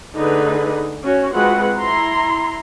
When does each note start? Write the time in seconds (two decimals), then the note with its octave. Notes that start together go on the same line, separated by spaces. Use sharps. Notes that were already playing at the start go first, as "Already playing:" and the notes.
0.16 D3 A3 D#4 G#4 B4
1.03 C#4 F#4 C#5
1.34 G#3 C4 F4 F#4 B4 F#5
1.79 E4 A#5 C6